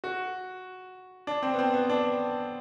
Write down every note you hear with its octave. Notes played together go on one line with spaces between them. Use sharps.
F#4
D4
C4
B3
C4
B3
D4